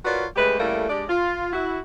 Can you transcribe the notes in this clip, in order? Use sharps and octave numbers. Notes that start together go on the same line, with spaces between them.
F4 F#4 A#4 B4 C#5 D5
C#3 G#3 A3 G4 B4
C#3 G3 A3 A#3 E4 A4
G#3 D4 G4 D5
F4
E4 F#4